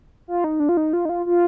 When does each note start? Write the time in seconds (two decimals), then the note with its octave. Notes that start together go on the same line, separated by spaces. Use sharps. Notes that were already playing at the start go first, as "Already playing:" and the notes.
0.28 F4
0.44 D#4
0.60 D4
0.69 F4
0.77 D#4
0.93 F4
1.05 D#4
1.09 F4
1.26 F4